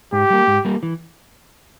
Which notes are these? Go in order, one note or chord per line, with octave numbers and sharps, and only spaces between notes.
G#2 G4
G3 A#3
G#2
G3 A#3
E3